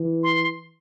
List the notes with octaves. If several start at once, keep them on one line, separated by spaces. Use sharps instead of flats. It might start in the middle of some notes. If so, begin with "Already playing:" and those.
Already playing: E3
C6